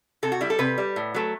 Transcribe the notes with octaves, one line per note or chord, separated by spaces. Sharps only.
C3 A4
F#4
G3 E4
A4
C3 B4
G3
A2
F#3 A3